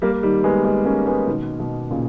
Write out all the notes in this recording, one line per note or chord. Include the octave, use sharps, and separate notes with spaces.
G3 A#3
D#3 G3
G#3 B3
G#3 B3
A#3 C#4
G#3 B3
B2 D#3
B2
A#2 C#3